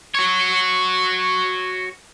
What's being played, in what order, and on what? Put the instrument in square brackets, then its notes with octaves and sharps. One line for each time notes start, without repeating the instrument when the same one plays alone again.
[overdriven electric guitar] F#4 C#5